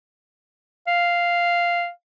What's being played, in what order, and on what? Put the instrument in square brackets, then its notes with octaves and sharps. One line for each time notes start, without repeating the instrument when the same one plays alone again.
[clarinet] F5